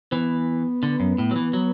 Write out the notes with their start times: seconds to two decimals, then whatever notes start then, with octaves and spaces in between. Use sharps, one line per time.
0.12 E3 B3
0.83 D3
1.00 F#2
1.18 A2
1.31 F#3
1.36 E3
1.53 F#3